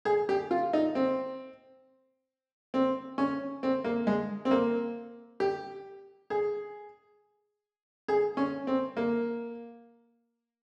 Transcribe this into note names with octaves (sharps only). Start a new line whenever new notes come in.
G#4
G4
F4
D#4
C4
C4
C#4
C4
A#3
G#3
C4
A#3
G4
G#4
G#4
C#4
C4
A#3